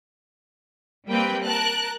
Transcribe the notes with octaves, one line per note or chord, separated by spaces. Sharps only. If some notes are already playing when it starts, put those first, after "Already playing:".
G3 A#3 C4 B4 G5
A#4 A5 F#6